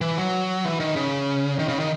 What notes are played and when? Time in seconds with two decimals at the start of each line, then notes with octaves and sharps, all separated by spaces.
0.01 E3
0.18 F#3
0.65 E3
0.80 D#3
0.96 C#3
1.59 D#3
1.68 C#3
1.80 D#3